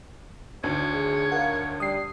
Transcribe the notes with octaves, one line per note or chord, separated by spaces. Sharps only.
D2 D#3 C#5
G#4
A#4 F5 F#5
G3 D#6 C7